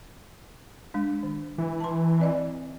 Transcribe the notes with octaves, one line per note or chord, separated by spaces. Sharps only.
G#3 D4
D#3
E3
A5 C6
C4 D5 D#5